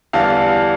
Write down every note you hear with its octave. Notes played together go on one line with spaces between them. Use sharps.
E2 D3 G3 D4 F5 A5